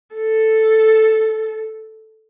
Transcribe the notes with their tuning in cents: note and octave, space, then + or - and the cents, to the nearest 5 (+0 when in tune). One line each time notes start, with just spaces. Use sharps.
A4 +0